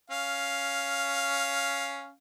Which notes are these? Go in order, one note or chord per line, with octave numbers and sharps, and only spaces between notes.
C#4 F5